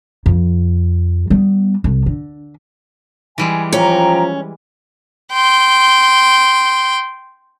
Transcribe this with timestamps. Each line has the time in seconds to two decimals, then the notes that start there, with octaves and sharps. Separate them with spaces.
0.26 F2
1.30 G3 B3
1.84 C2
2.06 D3
3.38 E3 G3 G#3 G#5
3.73 F3 C#4 G5 A#5
5.33 G5 C6